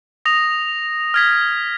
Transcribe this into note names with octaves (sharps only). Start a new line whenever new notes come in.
D#6 A#6 F7
F6 G#6 B6